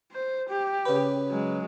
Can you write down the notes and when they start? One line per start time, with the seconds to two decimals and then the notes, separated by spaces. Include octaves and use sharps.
0.12 C5
0.49 G4
0.85 C#3 B4
1.29 F#3 G#3